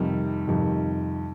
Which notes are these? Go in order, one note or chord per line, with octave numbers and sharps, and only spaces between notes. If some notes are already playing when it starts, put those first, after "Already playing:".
Already playing: F2 C3 D#3 G3
F2 C3 D#3 G3